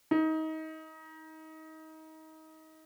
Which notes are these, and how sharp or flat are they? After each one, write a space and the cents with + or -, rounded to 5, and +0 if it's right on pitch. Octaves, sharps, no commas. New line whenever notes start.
D#4 +25